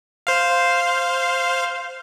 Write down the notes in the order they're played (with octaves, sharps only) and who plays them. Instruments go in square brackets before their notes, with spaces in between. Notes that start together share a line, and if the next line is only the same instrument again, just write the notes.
[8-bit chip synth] C5 F5